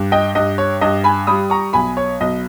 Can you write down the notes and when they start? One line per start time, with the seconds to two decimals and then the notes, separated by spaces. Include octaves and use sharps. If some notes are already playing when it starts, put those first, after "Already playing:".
Already playing: G2
0.12 D#5 G5
0.35 G2 D#5
0.58 C#5
0.81 G2 D#5
1.04 G#5 B5
1.27 G3 B5 D#6
1.50 A#5 C#6
1.73 B1 G#5 B5
1.97 C#5
2.21 B1 D#5